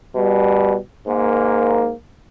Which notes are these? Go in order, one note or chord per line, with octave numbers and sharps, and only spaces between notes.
B2 G3
G#2 A#3